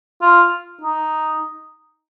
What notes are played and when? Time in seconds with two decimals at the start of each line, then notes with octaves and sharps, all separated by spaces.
0.22 F4
0.81 D#4